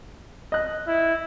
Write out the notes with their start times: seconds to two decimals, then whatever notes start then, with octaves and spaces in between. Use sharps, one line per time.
0.52 D#5 F#6
0.87 E4